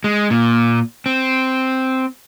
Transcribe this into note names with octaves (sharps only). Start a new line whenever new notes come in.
G#3
A#2
C4